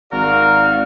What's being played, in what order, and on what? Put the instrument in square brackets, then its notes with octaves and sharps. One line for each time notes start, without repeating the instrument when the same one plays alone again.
[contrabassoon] G#1 [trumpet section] F#4 D5 F5 [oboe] A#4